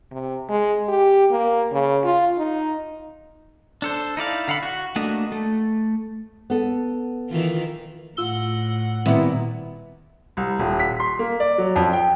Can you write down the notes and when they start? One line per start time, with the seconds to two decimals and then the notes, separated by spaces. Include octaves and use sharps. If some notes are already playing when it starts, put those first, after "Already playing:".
0.12 C3
0.49 G#3
0.88 G4
1.31 A#3
1.72 C#3
2.04 F4
2.38 D#4
3.82 D4 A4 C5
4.17 D#4 E4 D5 F5
4.48 D3 F5 F#5 B5
4.63 F#4 F#5
4.96 A3 A#3 D4 F#4 D#5
5.32 A3
6.50 B3 A4
7.29 D#3 E3 F4
8.17 A2 F4 F#5 E6 G7
9.06 A#2 D#3 G3 B3 C4 E4
10.37 C2
10.59 D#1
10.80 B6
11.00 C6
11.19 A#3
11.40 D5
11.58 F#3
11.76 F2
11.93 G5